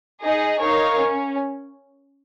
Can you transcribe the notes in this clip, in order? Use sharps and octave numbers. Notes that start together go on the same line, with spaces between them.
D#4 G#4 D#5
D#4 A#4 C#5 F5
C#4